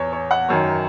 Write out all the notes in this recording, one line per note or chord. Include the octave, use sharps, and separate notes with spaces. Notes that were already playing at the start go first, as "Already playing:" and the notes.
Already playing: E2 C#5 G#5
C#5
F#5
F#2 D#3 C#5